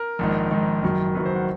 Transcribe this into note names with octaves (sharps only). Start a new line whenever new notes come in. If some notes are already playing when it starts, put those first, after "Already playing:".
Already playing: A#4
A#1 G#2 D#3
A#1 G#2 D#3
F#1 F#2 D#3 F#3
F#1 F#2 D#3 F#3 B4
C5
F#5